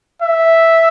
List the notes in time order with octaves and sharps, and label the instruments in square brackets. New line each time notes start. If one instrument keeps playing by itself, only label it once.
[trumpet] E5